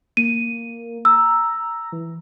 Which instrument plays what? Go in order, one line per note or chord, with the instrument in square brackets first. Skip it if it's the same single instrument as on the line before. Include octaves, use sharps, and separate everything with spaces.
[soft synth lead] A#3 [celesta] D#7
[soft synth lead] A#5 [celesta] E6
[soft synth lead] E3